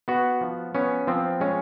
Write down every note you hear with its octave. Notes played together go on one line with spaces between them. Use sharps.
B3 F#4
F3
B3 C#4
F3 C4
G#3 C#4